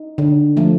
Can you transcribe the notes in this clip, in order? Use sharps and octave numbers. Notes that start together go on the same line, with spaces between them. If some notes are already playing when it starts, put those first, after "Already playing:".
Already playing: D#4
D3
F3 A3